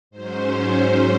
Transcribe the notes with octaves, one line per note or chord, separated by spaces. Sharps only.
G#2 F#3 C#4 C5